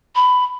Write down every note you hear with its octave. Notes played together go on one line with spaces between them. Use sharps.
B5